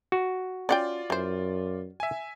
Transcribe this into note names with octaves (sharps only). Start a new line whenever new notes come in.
F#4
C#4 F4 D5 F#5 G5
F#2 E3 C5
E5 G#5